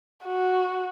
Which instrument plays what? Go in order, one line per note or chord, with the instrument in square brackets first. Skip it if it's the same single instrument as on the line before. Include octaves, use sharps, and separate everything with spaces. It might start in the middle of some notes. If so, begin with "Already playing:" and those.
[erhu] F#4